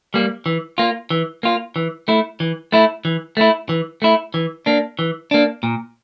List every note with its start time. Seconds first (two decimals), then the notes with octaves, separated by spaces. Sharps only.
0.14 G3 A#3
0.46 E3
0.78 A#3 F4
1.10 E3
1.43 A#3 F4
1.76 E3
2.08 A3 E4
2.40 E3
2.72 A3 E4
3.05 E3
3.37 A3 E4
3.69 E3
4.02 A3 E4
4.34 E3
4.66 A#3 D4
4.99 E3
5.31 A#3 D4
5.63 A#2